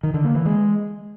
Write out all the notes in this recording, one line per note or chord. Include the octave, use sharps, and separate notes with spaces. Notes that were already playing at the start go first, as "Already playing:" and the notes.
D#3
D3
A#3
E3
G#3